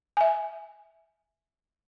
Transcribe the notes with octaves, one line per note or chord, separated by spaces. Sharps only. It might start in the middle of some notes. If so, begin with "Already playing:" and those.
E5 G#5